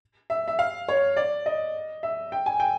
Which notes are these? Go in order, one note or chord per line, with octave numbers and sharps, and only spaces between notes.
E5
E5
F5
C#5
D5
D#5
E5
G5
G#5
G5